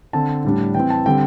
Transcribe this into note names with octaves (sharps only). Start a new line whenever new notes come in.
D3 C4 A5
A2 G3 D4
E3 C4 G5
A5
D3 G3 C4 G5